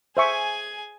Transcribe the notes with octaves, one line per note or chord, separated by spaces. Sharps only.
G#4 C5 E5 G#5 C#6